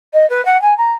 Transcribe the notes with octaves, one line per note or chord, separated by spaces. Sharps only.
D#5
B4
F#5
G#5
A#5